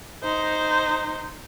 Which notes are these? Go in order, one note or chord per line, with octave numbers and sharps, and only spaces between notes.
D#4 C5